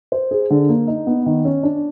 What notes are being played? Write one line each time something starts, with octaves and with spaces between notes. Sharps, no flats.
C5
G#4
D3
A#3
D#4
B3
D#3
C#4
D4